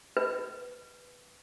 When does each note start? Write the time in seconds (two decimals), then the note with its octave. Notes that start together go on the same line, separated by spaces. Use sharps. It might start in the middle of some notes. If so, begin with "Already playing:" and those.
0.17 B4